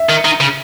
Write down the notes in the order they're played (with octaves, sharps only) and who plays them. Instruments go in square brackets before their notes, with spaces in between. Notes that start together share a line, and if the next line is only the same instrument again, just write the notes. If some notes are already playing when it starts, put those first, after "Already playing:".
Already playing: [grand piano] E5
[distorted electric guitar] D#3
D#3
C#3